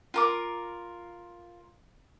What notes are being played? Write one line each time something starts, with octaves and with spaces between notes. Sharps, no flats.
F4 A#4 D6